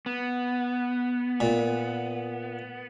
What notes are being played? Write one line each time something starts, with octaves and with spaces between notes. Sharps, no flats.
B3
A#2